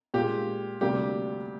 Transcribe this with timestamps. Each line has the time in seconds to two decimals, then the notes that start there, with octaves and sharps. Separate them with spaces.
0.14 A#2 G#3 G4
0.81 D2 C3 G3 A#3 G4